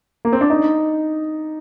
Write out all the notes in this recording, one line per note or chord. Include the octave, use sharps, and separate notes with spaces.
A#3
C4
D4
D#4